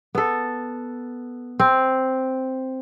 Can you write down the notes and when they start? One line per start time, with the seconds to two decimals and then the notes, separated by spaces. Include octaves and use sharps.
0.15 B3 A4
1.60 C4